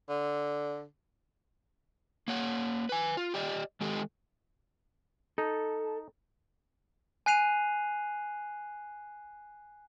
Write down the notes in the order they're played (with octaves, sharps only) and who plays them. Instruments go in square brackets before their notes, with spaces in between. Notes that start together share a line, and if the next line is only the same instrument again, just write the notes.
[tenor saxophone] D3
[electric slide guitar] A#3 C#5 F#5
B4 G#5
F4
G4 D5 D#5
D#3 G#3 G4 A4
[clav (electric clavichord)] D#4 [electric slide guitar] A4
[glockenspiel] G#5 F#6 C7 D#7 F7